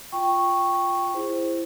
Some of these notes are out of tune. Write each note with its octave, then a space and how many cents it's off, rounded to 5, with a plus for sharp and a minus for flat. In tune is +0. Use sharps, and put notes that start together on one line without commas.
F4 +0 G5 +0 C#6 -5
E4 +20 G#4 -30 C5 +0